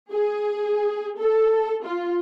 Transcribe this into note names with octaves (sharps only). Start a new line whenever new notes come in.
G#4
A4
F4